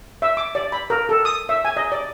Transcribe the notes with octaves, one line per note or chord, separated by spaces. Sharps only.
E5
D6
D5
B5
A#4
A4
D#6
E5
G#5
D#5
D5